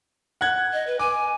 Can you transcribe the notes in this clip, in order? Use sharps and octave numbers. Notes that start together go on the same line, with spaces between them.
F#5 F#6 G#6
D#5
B4
G#5 D6